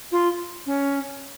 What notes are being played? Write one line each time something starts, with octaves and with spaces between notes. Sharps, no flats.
F4
C#4